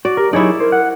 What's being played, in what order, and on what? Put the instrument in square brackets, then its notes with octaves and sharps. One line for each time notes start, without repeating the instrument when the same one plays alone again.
[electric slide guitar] F#4 [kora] D5
[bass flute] G4 [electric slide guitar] A#4
[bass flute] F#3 [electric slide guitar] D#4 G#4 C#5 [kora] E4 D5
[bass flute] A#4 [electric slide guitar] C5
[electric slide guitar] F#5